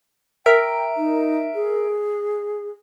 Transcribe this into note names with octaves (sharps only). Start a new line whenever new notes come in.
A#4 E5 G5 D7
D#4
G#4